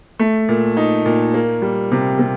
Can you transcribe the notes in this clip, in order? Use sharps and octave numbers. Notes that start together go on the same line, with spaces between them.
A3
A#2
D#4
A#2
A#3
G3
C3
C3